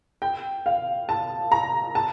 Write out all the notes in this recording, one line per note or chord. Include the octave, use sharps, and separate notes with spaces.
G5
F5
A5
A#5
A5